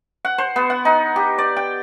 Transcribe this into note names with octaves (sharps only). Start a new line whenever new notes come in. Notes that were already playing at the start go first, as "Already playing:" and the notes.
F#5
C5
B3
F#5
D#4
G4
D5
G5